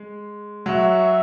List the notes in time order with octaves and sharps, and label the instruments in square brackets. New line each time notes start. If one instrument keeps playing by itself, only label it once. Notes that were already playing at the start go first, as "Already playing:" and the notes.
Already playing: [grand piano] G#3
[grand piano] F#3 [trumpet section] F#4 C#5 E5